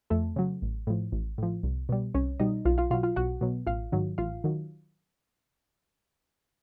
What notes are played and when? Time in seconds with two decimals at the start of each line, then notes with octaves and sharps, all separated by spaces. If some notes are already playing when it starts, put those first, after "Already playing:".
0.10 F2 A3 A4
0.36 C#3 F#3
0.62 A1
0.87 A2 F3
1.12 A1
1.38 A2 F3
1.63 C2
1.89 B2 G3
2.14 C2 C#4 C#5
2.40 B2 G3 D#4 D#5
2.65 B1 F4 F5
2.78 F4 F5
2.90 B2 F#3 F4 F5
3.03 F4 F5
3.16 B1 F#4 F#5
3.41 B2 F#3
3.67 A1 F4 F5
3.92 G#2 D#3 F#3
4.18 A1 F4 F5
4.44 D#3 F#3